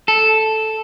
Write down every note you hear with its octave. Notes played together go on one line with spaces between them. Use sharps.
A4